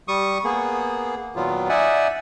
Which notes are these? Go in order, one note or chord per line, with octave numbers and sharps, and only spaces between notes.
G3 C#6 D#6
A#3 B3 G#4
A#2 D#3 F#3 B3 F4
D#4 D5 E5 F#5 G#5